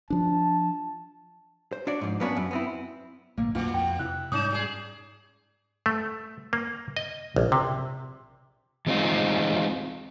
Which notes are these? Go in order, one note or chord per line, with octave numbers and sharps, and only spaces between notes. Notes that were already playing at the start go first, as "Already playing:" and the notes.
F3 D4 A5
C5
D4 F#4 C#5 D5
G#2 F3
F#3 A#3 B3 C#4 D4 F#4
F#2
B3 C4 E4
A#1 G#2 D3 A#3
B1 F#2 A#2 A#3 F4 F#5
F2 G5
C3 E4 F#6
G#2 G3 C#4 D#4 D#6 G6 E7
A#2 G4 G#4
A3
A#3
D#5
A#1
C3
E3 G#3 C4 D#4 F4